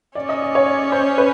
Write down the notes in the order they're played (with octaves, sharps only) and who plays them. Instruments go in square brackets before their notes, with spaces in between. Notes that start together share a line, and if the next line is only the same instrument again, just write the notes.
[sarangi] C#4 [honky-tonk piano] D5
[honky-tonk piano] D#5
D5
C#5
D5
C5
B4